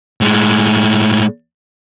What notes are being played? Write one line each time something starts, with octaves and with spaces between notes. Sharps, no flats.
A2 G#3